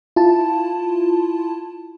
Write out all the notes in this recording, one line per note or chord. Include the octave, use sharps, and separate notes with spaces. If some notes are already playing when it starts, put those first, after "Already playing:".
E4 F4 A5